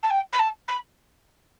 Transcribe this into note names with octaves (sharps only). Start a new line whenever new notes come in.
A5
G5
B5
A5
B5